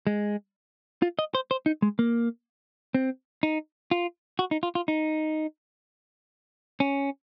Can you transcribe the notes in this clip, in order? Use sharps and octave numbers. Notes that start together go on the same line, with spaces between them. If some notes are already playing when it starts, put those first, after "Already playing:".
G#3
F4
D#5
C5
C5
D#4
G#3
A#3
C4
D#4
F4
F#4
D#4
F4
F4
D#4
C#4